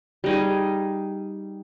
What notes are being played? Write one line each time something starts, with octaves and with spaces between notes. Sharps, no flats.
G3 D#4 G#4